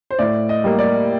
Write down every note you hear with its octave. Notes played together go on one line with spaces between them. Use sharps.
C5
A2 D5
D#5
G3 A#3
D5